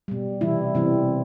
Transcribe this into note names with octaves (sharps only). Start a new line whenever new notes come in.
B2 G3
C3 E3 G3 E4
C3 E3 G3 C4